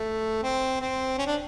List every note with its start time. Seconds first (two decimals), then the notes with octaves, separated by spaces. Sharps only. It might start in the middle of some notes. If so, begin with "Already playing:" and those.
Already playing: A3
0.43 C4
0.81 C4
1.18 C#4
1.27 D4